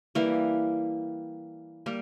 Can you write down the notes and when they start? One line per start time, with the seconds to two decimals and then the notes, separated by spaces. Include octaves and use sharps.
0.15 E3 G3 A#3
1.86 G3 A#3